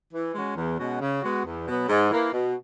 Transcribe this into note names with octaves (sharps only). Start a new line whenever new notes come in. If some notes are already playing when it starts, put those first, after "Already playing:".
E3
G#3 C#4 F#4
E2
B2 G#3 C#4 F#4
C#3
G#3 B3 F#4
E2
B2 F#3 B3
G#2
E3 A#3
B2